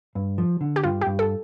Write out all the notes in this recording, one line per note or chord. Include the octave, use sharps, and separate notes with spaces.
G2
F3
D3
G4
G2 F4
G4
G2
A4